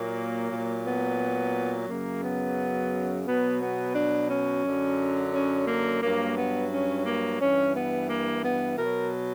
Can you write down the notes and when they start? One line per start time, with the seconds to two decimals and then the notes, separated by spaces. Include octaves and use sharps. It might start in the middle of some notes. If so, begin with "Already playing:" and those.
Already playing: A#2 F#3 A#3
0.51 A#2 F#3
0.85 B3
1.89 F#2 C#3 F#3 A#3
2.23 B3
3.26 B2 F#3 B3
3.61 B3
3.95 D4
4.29 C#4
4.65 F#2 D3 F#3
5.33 C#4
5.67 A#3
6.02 G2 F#3 A#3
6.36 B3
6.71 C#4
7.05 A#3
7.39 G2 E3 C#4
7.75 B3
8.10 A#3
8.44 B3
8.78 B2 F#3 A#4